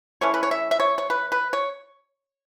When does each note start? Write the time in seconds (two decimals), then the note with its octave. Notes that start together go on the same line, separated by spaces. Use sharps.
0.21 E3 A3 C#4 C#5
0.34 B4
0.43 C#5
0.51 E5
0.71 E5
0.80 C#5
0.98 C#5
1.10 B4
1.32 B4
1.53 C#5